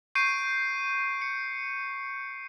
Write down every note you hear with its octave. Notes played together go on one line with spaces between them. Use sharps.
C#6 G6 C7 D7 D#7
C#7